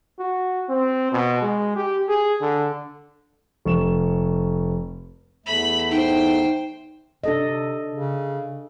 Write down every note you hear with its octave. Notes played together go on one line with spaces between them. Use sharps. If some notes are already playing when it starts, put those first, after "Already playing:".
F#4
C4
B2
G#3
G4
G#4
D3
F1 C#6 E7
E2 A3 B5
D#4 C5 G5
C3 D4 A4 D#5
C#3